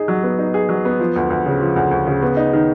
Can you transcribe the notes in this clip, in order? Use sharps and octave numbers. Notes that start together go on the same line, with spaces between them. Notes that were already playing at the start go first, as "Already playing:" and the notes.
Already playing: D#4 G#4
F#3
B3
D#4
G#4
F#3
B3
F3
D2
D2
C#3
F3
D2
D2
C#3
B3
D#4
D#3